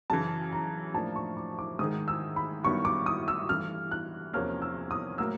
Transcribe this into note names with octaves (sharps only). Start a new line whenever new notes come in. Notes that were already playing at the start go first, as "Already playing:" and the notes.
F#2 C#3 E3 A5
A#5
A2 F3 A#3 D4 A5
C#6
D6
D6
G#2 D#3 G#3 D#6
E6
B5
G2 D#3 F#3 B3 E4 C#6
D6
D#6
E6
G2 E3 A3 F6
F#6
E2 C3 F3 A#3 C#4 F6
E6
D#6
A2 F#3 A#3 E6